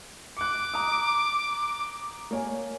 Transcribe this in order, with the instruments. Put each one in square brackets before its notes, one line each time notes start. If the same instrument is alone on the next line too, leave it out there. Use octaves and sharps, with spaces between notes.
[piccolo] D6 [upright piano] F#6 C#7
[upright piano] A#5 D#6
A#3 C#5 G#5